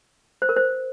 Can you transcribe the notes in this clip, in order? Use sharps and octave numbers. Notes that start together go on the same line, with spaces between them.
C5
A#4
C5